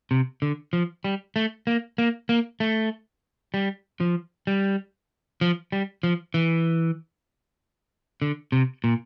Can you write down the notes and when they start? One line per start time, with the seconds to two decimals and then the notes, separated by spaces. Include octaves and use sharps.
0.11 C3
0.42 D3
0.73 F3
1.04 G3
1.36 A3
1.67 A#3
1.98 A#3
2.29 A#3
2.60 A3
3.54 G3
4.00 F3
4.47 G3
5.41 F3
5.72 G3
6.03 F3
6.34 E3
8.22 D3
8.52 C3
8.84 A#2